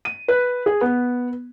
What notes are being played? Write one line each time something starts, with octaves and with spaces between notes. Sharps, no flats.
D#7
B4
G#4
B3